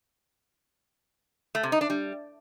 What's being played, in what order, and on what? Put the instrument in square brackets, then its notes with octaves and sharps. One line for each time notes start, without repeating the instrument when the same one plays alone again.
[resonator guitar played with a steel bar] A3
C3
D#4
D4
G3